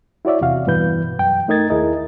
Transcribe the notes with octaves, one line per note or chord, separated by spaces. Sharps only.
E4 F#4 C#5 D5 E5
E2 C3 F#4 F5
G2 B2 E3 B4 G6
F#2 G5
A3 D#4 A#4 D#5 G#6 A6
D#2 E4 G#4 A#4 D#5